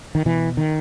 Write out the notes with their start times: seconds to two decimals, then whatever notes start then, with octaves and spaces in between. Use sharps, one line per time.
0.15 D#3
0.25 B2 E3
0.57 D#3